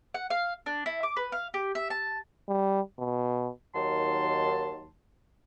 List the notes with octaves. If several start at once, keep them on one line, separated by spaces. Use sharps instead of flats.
F#5
F5
D4
E4
D6
B4
F5
G4
E5
A5
G3
B2
D#2 D#3 F#3 A5 C6